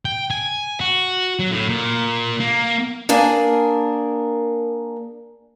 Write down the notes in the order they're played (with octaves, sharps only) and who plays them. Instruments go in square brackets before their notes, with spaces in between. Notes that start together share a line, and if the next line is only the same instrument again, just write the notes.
[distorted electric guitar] G5
G#5
F#4
F#3
A2
A#2
A#3
[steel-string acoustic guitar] A#3 D4 G#4 A#4